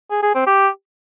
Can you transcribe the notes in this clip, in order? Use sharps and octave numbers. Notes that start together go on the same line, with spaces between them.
G#4
G#4
C4
G4